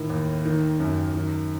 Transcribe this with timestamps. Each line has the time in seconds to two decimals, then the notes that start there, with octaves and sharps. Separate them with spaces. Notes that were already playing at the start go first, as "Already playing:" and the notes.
Already playing: A2 D#3
0.10 D#2
0.45 D#3
0.80 F#2
1.15 D#3